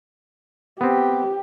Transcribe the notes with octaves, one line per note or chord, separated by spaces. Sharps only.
B3 C4 G4